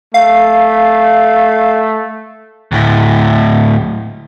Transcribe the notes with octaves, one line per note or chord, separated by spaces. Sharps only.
A3 F5
D2 A2